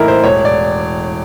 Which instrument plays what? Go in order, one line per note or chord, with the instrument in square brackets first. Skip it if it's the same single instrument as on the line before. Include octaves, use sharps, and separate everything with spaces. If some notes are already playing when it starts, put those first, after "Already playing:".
Already playing: [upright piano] A2 E3 D#4 E4 A#4
C5
E1 C#5
D5